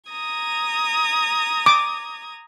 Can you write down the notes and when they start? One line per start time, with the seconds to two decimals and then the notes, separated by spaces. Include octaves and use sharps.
0.11 A#5 D#6 G#6
1.66 D6